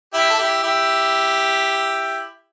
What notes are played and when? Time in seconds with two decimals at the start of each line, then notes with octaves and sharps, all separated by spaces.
0.13 E4 G4
0.30 A4
0.39 E4 G4
0.63 E4 G4